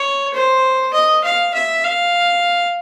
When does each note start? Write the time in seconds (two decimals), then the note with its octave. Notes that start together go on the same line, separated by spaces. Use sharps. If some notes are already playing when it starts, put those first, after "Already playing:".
Already playing: C#5
0.33 C5
0.93 D#5
1.24 F5
1.54 E5
1.84 F5